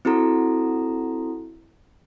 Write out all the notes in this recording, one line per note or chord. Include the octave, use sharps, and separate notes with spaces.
C4 E4 F#4 A4 A#5